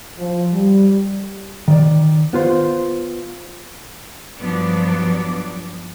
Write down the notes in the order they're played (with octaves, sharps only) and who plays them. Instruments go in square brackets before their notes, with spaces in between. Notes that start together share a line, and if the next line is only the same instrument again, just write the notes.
[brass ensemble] F3
G3
[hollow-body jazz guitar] D#3 D5
B3 F4 C5
[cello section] G2 F3 F#3 B3 D4 D5